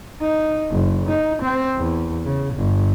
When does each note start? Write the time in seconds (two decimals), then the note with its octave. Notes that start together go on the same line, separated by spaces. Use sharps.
0.22 D#4
0.71 F#1
1.09 D#4
1.42 C4
1.78 E2
2.25 C#3
2.55 G1